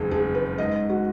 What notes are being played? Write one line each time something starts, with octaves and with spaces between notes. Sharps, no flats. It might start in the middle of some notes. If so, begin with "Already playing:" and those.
Already playing: F#1 F2 D#3 G#4
F#1 G#4
B4
G#2 D#5
F#4